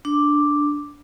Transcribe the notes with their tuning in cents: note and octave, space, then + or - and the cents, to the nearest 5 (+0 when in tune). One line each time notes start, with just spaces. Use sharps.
D4 +0 D6 +0